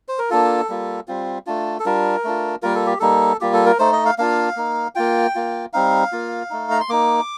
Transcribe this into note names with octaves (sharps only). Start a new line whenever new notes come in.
C5
A#4
A#3 D4 F4 A4
G3 A#3 F4
G3 C4 F4
A3 D4 F4
A4
G3 D4 F4 A#4
A3 D4 F4
G3 A#3 F4 A#4
A4
G4
G3 A#3 D#4 A4
G3 A#3 F4 G4
A4
A#4
A3 D#4 C5
D#5
F5
A#3 D4 F4 F5
A#3 D#4
A#3 F4 G5
A#3 F4
G3 C4 D#4 F5
A#3 F4
A3 D#4
A#5
C6
A#3 D#4 D6